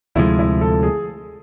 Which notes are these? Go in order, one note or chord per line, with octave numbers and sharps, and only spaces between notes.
D2 C3 F3 G#3 E4
E4
A4
G#4